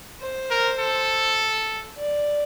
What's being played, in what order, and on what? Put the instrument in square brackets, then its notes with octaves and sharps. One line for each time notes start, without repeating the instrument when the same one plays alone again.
[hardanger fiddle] C5
[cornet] A#4
A4
[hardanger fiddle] D5